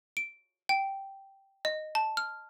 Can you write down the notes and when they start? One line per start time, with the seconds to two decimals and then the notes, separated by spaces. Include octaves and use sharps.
0.17 D7
0.69 G5
1.65 D#5
1.95 A5
2.17 F6